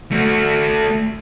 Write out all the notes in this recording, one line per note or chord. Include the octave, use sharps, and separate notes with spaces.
A3 F#4